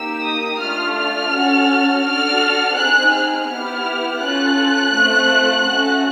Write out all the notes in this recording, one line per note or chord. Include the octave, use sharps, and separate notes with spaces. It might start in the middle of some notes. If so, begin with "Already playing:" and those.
Already playing: A#3 D#4 G4 E6
D#6
A3 D4 F4 F6
F6
C#4 F#4 A4
D4 F#4 A4 F6
C4 D#4 G#4 F#6
F6
B3 E4 G4 F6
C#4 F4 A4 F#6
A3 C4 F4
A3 C#4 F#4 A4